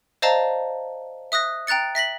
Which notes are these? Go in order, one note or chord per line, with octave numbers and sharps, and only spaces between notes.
C5 D5 D#5 F5 A5 A#5
E5 D#6 F#6 A#6
G5 A#5 F#6 A6 C#7
E5 A#6 B6 F#7